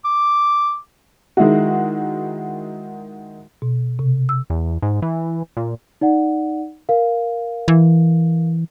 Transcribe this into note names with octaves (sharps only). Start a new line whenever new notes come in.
D6
D#3 G#3 E4 F#4
B2
C3
E6
E2
G#2
E3
A#2
D#4 D5 F#5
A#4 F5
E3